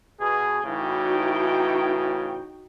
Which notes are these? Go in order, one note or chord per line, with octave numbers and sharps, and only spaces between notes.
B2 G#4
A2 C#3 E3 D#4 F#4 G5